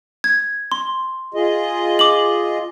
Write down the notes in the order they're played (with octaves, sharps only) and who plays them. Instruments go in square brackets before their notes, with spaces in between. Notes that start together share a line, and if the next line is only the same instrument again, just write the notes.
[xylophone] G#6
C6
[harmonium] F4 G#4 D#5
[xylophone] D6 F#7